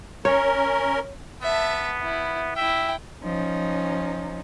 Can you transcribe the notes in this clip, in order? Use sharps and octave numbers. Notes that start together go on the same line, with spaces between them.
C#4 A#4 C#5
B3 E5 A5
E4
E4 E5 G5
F3 C#4 D#4